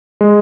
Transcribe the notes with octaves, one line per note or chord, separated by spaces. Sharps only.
G#3